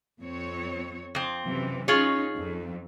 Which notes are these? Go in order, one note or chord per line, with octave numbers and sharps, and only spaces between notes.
F2 C4 C#5
F2 C4
F#2 C3 E3
C#4 D#4 F4 G#4 C#5
F2